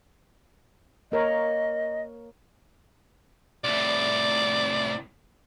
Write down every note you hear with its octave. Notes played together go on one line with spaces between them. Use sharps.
A#3 A#4 C#5 D#5
C2 A2 D5